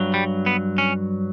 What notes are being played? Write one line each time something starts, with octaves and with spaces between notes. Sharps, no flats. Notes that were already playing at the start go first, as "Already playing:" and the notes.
Already playing: G2 F#3
G3
B3
C#4